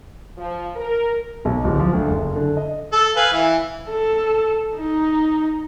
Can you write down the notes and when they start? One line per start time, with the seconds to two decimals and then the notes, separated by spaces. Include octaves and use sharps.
0.37 F3
0.76 A#4
1.45 B1
1.64 D1
1.80 F3
1.93 D2
2.07 F#1
2.36 D3
2.57 D#5
2.93 A4
3.16 B4 F5 G#5
3.33 E3
3.89 A4
4.77 D#4